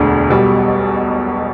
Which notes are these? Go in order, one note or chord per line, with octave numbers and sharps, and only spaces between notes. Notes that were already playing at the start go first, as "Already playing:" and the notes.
Already playing: E1 D2 D3
B1 B2 G3